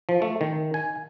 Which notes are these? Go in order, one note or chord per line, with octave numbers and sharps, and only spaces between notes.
F3
A3
D#3
G#5